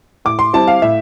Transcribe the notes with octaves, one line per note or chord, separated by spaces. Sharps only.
A2 D6
C6
G3 C4 E4 A5
F5
A2 E5